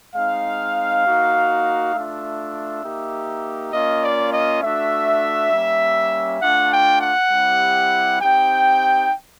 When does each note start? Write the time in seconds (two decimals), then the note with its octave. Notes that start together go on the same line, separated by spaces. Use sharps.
0.16 G#3 C4 D#4 F5
1.06 A#3 D#4 F#4
1.95 A3 D4 F4 E5
2.84 A#3 D#4 G4
3.73 A#3 C#4 F4 D#5
4.03 D5
4.33 D#5
4.63 A3 D4 F#4 E5
5.52 G3 A#3 C#4
6.41 A3 D4 F4 F#5
6.72 G5
7.01 F#5
7.31 G3 C4 E4 G4
8.20 C4 D#4 G4 G5